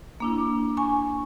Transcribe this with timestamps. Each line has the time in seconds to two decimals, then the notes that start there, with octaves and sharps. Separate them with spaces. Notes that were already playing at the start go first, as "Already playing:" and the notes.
0.20 A#3 D4 E4
0.77 G#5 C#6